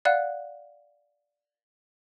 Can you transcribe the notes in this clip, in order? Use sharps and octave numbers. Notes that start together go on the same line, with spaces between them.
D5 F5 F#5 F#6